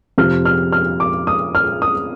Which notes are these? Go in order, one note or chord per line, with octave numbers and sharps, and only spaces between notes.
F2 C3 F3 F6
F6
F6
D6
D#6
F6
D#6